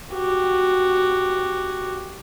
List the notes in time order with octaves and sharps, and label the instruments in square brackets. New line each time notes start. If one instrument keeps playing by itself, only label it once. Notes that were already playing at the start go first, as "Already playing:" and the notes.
[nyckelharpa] F#4 G4